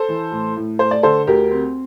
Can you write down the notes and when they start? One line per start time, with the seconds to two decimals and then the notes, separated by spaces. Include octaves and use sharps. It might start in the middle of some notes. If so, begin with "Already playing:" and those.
Already playing: A4 C5
0.09 E3
0.32 A2
0.57 A2
0.79 A3 C5
0.91 D5
1.03 D3 A4 C5
1.27 D2 G4 A#4
1.51 C4